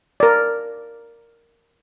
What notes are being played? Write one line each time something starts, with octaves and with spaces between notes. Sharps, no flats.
A#4 D5